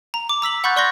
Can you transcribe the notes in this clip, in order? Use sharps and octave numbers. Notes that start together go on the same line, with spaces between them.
A#5
D6
A#5 E6 B6 F#7
F#5 B5 C#6 F#6 G6 A6
D5 C6 C#6 F#6 G6 A#6